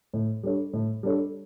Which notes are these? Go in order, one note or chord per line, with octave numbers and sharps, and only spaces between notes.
A2
G3 D4 A4 C#5
A2
G3 D4 A4 C#5